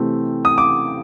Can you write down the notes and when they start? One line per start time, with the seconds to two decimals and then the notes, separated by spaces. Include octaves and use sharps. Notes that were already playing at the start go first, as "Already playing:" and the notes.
Already playing: C3 E3 A3 C4
0.45 D#6
0.58 D6